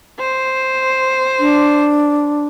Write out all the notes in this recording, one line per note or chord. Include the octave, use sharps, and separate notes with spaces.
C5
D4